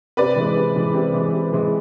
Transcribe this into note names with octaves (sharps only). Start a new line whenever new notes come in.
C3 B4 D5
E3 G#3
C3
E3 G#3
C3
E3 G#3
C3
E3 G#3